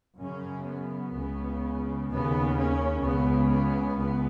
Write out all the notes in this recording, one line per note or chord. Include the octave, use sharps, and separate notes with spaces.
F#2 C#3 C#4
B3
C#2 C#3
D#2 C#3 B3
C#4
C#2 C#3 B3
B3
C#2 B3